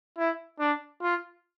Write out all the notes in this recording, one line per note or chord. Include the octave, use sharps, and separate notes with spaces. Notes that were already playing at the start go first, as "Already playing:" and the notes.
E4
D4
F4